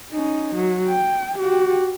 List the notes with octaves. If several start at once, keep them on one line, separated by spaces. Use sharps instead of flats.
C#4 D#4
F#3
G5
F#4 G4